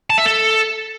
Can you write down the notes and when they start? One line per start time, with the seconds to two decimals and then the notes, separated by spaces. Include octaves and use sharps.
0.10 A5
0.18 E5
0.25 A4